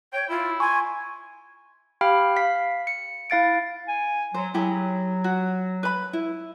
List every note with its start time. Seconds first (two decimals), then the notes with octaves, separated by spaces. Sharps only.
0.13 C#5 G5
0.29 E4 F4
0.60 G#5 C6 C#6
2.01 G4 F5 G5 B5 F6
2.36 F5 B6
2.87 C#7
3.30 E4 F5 A6 D7
3.88 G#5
4.34 F#3 C5
4.54 F#3 E4 G4 G#4
5.24 F#4
5.83 B4 B5
6.13 E4